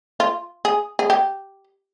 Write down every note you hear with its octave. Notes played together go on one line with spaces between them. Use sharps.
F4
G#4
G#4
G4